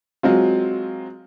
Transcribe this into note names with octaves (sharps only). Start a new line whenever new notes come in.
F#3 G#3 C4 F4